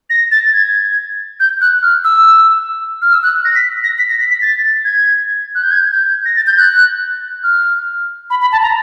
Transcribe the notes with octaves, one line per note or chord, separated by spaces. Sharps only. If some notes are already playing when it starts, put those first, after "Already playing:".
A#6
A6
G#6
G6
F#6
F6
E6
F6
E6
F#6
A#6
B6
A#6
B6
A#6
B6
B6
A6
G#6
F#6
G6
G#6
G6
A#6
A6
G6
F#6
F6
B5
B5
A5
A#5